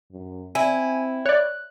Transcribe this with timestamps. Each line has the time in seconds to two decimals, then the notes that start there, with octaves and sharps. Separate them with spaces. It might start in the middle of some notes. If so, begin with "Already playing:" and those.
0.12 F#2
0.55 C4 E4 G#5
1.26 C#5 D5 F#6